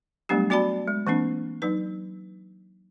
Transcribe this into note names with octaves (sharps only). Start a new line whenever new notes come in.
F#3 G3 A3 B3 D4 G4
B3 F#4 D5 A5 B5
G#3
E3 A#3 C4 D4
F#3 D#4 B4